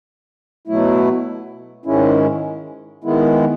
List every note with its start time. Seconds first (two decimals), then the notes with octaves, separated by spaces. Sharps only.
0.67 B2 F#3 A3 E4
1.86 G#2 D#3 G#3 C#4 E4
3.04 D#3 G#3 B3 E4